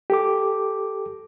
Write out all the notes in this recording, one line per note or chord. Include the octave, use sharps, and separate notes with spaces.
G4 A4 D6